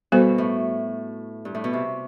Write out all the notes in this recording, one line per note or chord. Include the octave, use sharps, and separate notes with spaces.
B2 G3 B3 F#4 A4 C5
A2
G2
A2
B2
C3